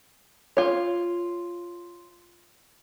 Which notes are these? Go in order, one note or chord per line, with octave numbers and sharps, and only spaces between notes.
F4 C#5